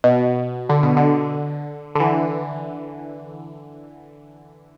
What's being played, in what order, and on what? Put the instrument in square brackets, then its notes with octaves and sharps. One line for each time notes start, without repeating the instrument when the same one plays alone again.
[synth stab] B2
D3
B2
D3
D3
E3